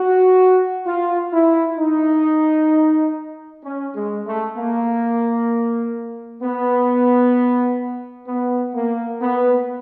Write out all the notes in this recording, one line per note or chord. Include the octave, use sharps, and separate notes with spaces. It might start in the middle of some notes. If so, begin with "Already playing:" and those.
Already playing: F#4
F4
E4
D#4
C#4
G#3
A3
A#3
B3
B3
A#3
B3